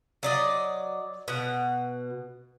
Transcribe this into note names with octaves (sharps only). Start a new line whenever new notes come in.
F#3 D5 D#5
B2 F#5